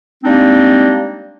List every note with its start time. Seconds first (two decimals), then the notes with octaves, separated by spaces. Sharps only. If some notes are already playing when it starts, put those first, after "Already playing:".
0.24 G3 G#3 A#3 C4 D4 D#4